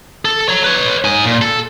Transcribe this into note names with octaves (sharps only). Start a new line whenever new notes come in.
A4
C#5 A#5
B4 C#5
D#4 G#5
A#2
A4